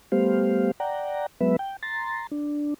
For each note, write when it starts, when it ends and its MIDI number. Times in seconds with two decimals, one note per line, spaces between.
0.12 0.71 55
0.12 0.71 57
0.12 0.71 59
0.12 0.71 67
0.12 0.71 72
0.12 0.71 77
0.80 1.26 74
0.80 1.26 78
0.80 1.26 79
0.80 1.26 82
1.41 1.56 54
1.41 1.56 56
1.41 1.56 59
1.41 1.56 71
1.41 1.56 76
1.59 1.77 79
1.83 2.27 82
1.83 2.27 84
1.83 2.27 93
2.31 2.74 62